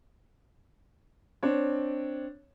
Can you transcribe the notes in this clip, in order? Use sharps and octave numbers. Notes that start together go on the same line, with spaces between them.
C4 D4 C#5